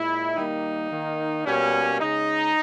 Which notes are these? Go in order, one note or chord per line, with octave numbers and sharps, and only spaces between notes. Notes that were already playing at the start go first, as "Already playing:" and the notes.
Already playing: A#2 G#3 E4
D#3 G3 A#3 D#4
D#3 A#3
B2 G3 A#3 C#4
C#3 G#3 D#4